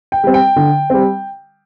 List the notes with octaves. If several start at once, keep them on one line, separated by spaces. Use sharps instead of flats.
G5
G3 C4
G5
D3
G3 C4